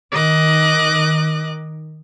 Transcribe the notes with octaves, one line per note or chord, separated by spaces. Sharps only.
D#3 D#5 D6 F#6